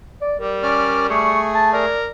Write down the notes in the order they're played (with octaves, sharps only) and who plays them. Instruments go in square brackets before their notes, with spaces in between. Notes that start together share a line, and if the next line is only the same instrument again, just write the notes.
[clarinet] D5
[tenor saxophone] G3 [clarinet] A#4
[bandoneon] C#4 D5 F6
[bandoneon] A3 G#4 [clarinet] C#6
[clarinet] A5
[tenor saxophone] A#4 [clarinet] D5